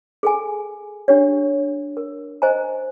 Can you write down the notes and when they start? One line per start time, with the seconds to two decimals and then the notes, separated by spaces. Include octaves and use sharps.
0.23 G#4 A4 G#5
1.08 D4 G4 C#5
1.97 A#4
2.42 C5 D#5 G#5 A#5